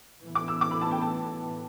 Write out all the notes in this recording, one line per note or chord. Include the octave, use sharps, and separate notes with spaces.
A2 E3 B3
D6
E6
D6
B5
A5
G5
A5